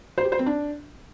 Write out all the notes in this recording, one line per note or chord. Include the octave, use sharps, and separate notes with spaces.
C5
G4
C5
C4
D4